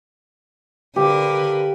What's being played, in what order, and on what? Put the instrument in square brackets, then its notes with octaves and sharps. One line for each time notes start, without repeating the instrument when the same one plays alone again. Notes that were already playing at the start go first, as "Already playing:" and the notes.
[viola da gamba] D3 A#4 B4 [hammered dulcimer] G4 F5